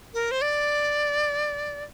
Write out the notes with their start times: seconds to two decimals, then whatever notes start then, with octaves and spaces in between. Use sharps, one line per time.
0.14 A#4
0.31 C5
0.42 D5